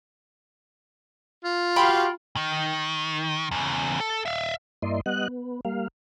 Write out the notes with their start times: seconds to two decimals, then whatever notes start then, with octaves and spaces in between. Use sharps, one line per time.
1.44 F4
1.76 F#4 G4 F5 G5 B5 C6
2.36 D#3
3.51 E2 C#3
4.00 A4
4.26 E5 F5
4.82 G2 A#3 E4 D5 D#5 C6
5.06 G3 B3 D#5 F#5 F#6
5.28 B3
5.65 G3 A#3 F5